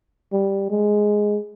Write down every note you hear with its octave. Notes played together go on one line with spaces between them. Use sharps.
G3
G#3